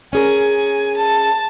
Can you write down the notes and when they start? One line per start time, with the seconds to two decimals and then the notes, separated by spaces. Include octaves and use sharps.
0.13 C#4 G#4 A#4 G#5
0.96 A5